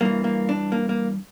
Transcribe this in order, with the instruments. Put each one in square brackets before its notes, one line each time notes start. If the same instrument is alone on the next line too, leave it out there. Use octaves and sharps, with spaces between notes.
[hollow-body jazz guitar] G2 E3 A#3
A#3
D4
A#3
A#3